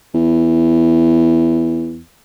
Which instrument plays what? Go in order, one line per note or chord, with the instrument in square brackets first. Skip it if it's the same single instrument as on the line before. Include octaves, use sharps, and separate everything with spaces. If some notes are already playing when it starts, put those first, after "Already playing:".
[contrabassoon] E2